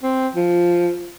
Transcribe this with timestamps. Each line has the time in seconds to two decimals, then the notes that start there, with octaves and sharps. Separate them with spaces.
0.03 C4
0.35 F3